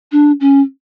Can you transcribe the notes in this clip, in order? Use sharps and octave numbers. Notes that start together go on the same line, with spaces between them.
D4
C#4